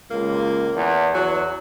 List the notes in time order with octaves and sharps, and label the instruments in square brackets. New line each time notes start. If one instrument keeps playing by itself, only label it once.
[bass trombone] C#2 [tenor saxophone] A#3
[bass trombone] E2
[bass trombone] E2 [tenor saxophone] F#3